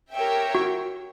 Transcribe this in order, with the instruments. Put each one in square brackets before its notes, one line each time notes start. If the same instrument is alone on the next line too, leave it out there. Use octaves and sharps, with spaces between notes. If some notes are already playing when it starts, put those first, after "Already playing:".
[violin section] G4 A#4 C#5 E5 G5
[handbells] F#4